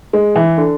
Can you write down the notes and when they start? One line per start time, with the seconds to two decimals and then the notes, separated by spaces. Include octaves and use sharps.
0.13 G#3
0.36 E3
0.58 D3